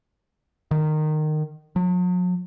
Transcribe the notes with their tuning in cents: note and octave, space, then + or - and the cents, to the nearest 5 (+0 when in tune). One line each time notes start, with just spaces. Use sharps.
D#3 -20
F#3 -45